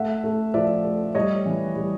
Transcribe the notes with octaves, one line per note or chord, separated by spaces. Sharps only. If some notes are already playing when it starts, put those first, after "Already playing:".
Already playing: A3 E5 F#5
A3
F3 D5 E5
A3
G3 C#5 D#5
E3
G3